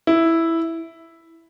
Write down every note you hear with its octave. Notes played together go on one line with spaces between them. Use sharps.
E4